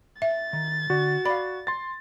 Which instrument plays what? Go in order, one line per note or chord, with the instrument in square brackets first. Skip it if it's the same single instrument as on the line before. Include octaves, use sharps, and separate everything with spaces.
[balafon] E5 [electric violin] A6
[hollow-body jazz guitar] D#3
[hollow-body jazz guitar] D3 [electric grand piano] F#4
[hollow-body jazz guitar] D5 F5 [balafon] B5
[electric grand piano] C6 A6